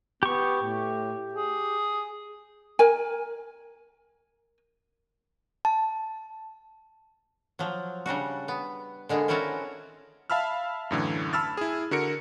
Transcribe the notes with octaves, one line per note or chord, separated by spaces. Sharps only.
B3 G4 C#6
A2
G#4
A#4 G#5
A5
F3 F#3
C#3 G3 D4 F#4
B3
D3 G#3 A#3 B3
C4 C#4 E4 F#4 A#4 A5
E5 F5 A5 B5 E6 F6
F#2 A2 D3 E3
A5 B5 E6 F6 A6
E4 G#4
D3 F#4 A#4 C#7 D7